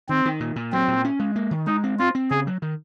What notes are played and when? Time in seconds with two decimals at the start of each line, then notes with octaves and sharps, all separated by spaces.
0.09 D#3 C4
0.25 D#3
0.40 A#2
0.56 A#2
0.72 F#3 C4
0.88 A#2
1.05 C#4
1.19 G#3
1.36 A#3
1.51 D#3
1.67 G#3 D#4
1.84 C4
1.99 C4 F4
2.15 C4
2.31 C#3 G#4
2.47 F#3
2.62 D#3